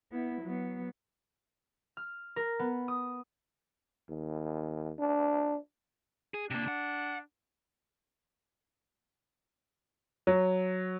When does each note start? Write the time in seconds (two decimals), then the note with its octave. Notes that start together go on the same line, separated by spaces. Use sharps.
0.11 B3 E4
0.42 F#3 B3
1.97 F6
2.36 A#4
2.59 B3
2.88 D#6
4.09 D#2
4.99 D4
6.34 G#4
6.51 C3 A#3 D4
6.68 F#5
10.27 F#3